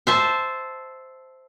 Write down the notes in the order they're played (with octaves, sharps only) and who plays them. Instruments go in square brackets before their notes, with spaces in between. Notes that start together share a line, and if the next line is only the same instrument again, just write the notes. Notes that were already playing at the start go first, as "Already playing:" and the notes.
[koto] C5 E5 A5